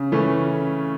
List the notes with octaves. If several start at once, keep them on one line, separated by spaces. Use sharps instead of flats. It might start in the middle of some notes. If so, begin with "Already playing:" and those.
Already playing: C#3
E3 A3 C#4